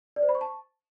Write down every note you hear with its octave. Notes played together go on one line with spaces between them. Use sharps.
D5
C5
B5
C#6
A5